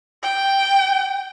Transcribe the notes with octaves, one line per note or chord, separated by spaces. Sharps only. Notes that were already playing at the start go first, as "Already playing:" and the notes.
G5